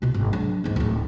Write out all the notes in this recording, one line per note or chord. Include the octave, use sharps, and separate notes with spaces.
B2 F4
G#1 G2
F#3 D4
E2 G#2
D1 A2